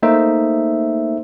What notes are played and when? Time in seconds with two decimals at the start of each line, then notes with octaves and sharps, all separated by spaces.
0.02 A3 A#3 D#4 C5 E5